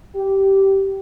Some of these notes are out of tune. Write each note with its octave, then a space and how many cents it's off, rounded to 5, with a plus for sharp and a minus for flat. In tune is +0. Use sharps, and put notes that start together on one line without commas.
G4 -15